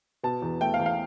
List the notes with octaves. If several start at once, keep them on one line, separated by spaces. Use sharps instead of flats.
B2 A5
E2
A3 G5
F5
E2
F5